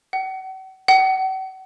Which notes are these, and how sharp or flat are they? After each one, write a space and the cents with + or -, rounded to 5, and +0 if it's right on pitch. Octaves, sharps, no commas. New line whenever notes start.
F#5 +40
F#5 +40